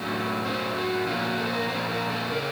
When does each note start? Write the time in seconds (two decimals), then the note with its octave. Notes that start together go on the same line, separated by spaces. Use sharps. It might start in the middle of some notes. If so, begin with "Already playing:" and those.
Already playing: A2 F#3 A3 C#4
0.45 A2 F#3 A3 C#4 C5
0.76 F#4
1.07 A#2 F3 A#3 C#4 F4
1.22 F#4
1.38 A4
1.46 C5
1.54 A#4
1.69 A#2 F3 A#3 C#4 C5
1.89 A#4
2.10 A4
2.30 C#3 C#4 A#4